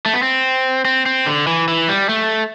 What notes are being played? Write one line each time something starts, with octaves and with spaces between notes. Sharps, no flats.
A3
B3
C4
C4
C4
D3
E3
E3
G3
A3